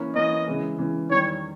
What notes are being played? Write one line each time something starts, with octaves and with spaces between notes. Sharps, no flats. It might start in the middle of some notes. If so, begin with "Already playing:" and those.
Already playing: E3 A#3 C#4
E3 A#3 C#4 D#5
C#3 E3 G#3
C#3 E3 G#3
E2 D#3 G3 C#5